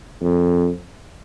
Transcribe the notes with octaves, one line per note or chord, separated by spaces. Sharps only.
F2